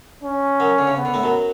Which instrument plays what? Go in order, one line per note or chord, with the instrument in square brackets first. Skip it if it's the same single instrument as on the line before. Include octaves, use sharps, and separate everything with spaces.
[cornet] C#4
[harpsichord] F#2 F#3
D3
C#3
[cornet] B3
[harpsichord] D3
A2 A3
F#2 F#3